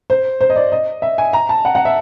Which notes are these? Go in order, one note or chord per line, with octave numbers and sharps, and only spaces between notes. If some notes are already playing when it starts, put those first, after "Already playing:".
C5
C5
D#5
D5
D#5
E5
G#5
A#5
A5
F#5
F#5
E5